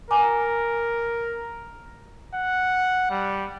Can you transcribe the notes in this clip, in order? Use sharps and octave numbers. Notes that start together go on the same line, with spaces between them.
A#4 G#5 A#5 D6
F#5
G3